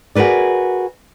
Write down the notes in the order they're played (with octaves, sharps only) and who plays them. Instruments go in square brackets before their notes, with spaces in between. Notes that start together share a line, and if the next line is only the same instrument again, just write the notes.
[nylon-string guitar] F#4 G#4 A#4 B4 D5